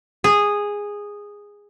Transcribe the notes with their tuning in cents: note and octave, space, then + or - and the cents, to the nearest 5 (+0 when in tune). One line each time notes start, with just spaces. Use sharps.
G#4 -10